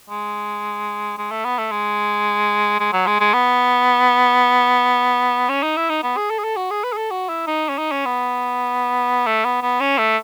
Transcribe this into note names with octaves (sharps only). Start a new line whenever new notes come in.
G#3
G#3
A3
B3
A3
G#3
G#3
F#3
G#3
G#3
B3
C#4
D#4
E4
D#4
B3
G#4
A4
G#4
A4
F#4
G#4
B4
G#4
A4
F#4
E4
D#4
C#4
D#4
C#4
B3
A3
B3
B3
C#4
A3